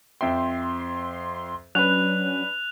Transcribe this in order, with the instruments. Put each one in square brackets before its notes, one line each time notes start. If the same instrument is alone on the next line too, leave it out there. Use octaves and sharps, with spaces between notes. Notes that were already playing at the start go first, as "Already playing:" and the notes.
[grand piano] F2 E5 G5 [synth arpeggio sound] C6
[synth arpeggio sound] F#3 C#4 [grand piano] D4 B4 [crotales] F#6 F7